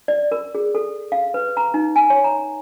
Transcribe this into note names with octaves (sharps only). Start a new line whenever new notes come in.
D5
A#4
G#4
A4
F5
B4
A#5
D#4
G#5
C#5
A#5